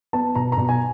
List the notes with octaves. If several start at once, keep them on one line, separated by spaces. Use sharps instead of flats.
B3 A5
B2 A#5
A#5
B2
G#5